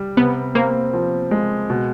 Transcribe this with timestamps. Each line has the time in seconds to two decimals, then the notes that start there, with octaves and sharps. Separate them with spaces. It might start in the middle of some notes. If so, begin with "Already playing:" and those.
Already playing: G3
0.17 C3 B3
0.55 A#3 C4
0.93 F3
1.31 G#3
1.70 B2